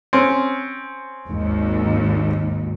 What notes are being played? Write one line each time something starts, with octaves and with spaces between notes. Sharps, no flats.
C4 C#4
G#1 D#2